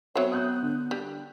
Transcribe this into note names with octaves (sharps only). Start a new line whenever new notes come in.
F#3 B3 C4 C#5 E5
B3 D#6 F#6 G6
D3
G3